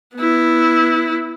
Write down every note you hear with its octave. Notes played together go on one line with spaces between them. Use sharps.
B3 E4